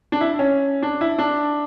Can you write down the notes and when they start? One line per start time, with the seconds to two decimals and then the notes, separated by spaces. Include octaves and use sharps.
0.12 D4
0.21 E4
0.39 C#4
0.83 D4
1.01 E4
1.19 D4